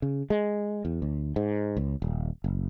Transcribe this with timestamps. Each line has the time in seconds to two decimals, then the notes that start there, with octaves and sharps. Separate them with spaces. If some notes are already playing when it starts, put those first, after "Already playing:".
0.02 C#3
0.30 G#3
0.85 E2
1.02 D2
1.36 G#2
1.77 C#2
2.02 D#1
2.44 F#1